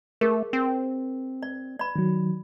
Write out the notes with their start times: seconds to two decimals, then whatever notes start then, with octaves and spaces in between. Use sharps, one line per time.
0.21 A3 G#4 A#4
0.53 C4
1.43 D5
1.79 D5 B5
1.96 D#3 F#3